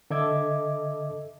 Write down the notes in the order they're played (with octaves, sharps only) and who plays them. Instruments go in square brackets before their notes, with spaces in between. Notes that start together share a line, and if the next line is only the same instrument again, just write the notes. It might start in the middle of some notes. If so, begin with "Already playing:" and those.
[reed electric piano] D3 A4 D#5 E5 D6 G#6